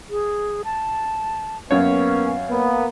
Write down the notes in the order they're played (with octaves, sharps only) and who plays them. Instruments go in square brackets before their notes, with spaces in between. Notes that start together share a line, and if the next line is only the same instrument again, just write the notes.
[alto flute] G#4
A5
[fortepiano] F#2 C#5 [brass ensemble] A#3 B3 C#4 [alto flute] F5
[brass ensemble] A#3 B3